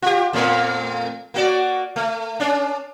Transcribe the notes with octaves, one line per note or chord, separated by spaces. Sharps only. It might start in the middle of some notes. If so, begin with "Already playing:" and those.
F4 G4
F2 A#2 A3
A#3 F#4 D5
A3
C#4 D4